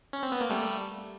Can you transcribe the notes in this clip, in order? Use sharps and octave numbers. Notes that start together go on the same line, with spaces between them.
C#4
C4
B3
A#3
G3 A3